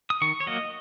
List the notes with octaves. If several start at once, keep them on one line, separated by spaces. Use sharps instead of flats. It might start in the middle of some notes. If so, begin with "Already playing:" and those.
D#6
D#3 C#6
C#5
F#3 A#3 D#5